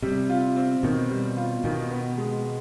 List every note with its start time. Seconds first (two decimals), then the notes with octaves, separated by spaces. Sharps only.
0.02 C3 G3
0.30 F4
0.56 C4
0.83 B2 D#3
1.10 G3
1.37 F4
1.64 B2 D#3
1.91 B3
2.18 G#3